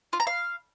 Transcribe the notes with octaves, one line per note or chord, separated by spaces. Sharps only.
F4
A#5
F5